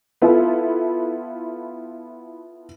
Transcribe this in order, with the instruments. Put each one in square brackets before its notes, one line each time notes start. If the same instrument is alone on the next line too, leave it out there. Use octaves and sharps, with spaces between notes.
[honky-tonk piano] B3 E4 F4 A4